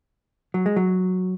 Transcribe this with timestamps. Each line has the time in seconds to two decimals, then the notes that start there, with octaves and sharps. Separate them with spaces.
0.54 F#3
0.66 G#3
0.76 F#3